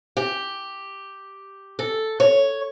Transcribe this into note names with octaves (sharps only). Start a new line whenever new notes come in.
G4
A4
C#5